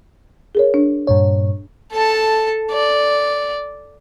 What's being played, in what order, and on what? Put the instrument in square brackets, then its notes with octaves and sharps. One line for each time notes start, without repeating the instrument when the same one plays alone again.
[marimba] G#4 A#4 C#5
D4
[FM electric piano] G2 A#2 C#5
[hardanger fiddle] A4 A5
D5